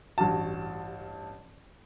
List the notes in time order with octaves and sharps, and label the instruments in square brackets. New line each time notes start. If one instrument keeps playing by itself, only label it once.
[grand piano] A1 G2 F#4 A5